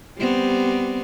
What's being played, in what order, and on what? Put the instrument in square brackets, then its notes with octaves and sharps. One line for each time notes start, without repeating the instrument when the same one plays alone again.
[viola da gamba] G3 B3 C4